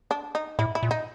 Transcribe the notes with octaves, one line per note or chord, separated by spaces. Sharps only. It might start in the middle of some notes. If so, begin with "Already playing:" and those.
D4
D#4
A2 E4
E4
A#2
D#4